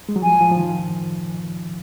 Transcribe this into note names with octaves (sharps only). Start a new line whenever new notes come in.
G#3
F#3
F3 G#5
F3
F3
D#3